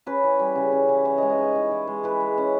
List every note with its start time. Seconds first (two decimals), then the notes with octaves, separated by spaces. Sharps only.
0.06 C#4 B4
0.24 E3
0.39 G3
0.55 C#3
0.72 C#4
0.89 E3
1.05 E3 C#5
1.18 G#3 D#5
1.30 D#5
1.38 D#4
1.55 E3
1.71 E3
1.87 G#3
2.04 E3 B4
2.20 G#3
2.38 C#4